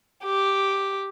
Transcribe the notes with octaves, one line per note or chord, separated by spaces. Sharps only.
G4